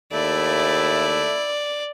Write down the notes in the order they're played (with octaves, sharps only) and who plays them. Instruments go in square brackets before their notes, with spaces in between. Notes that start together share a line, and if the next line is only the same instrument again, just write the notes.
[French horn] D#2 [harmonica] A3 [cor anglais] E4 [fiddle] D5